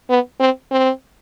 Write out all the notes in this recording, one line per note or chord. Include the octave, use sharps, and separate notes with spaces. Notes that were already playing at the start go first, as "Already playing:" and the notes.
B3
C4
C4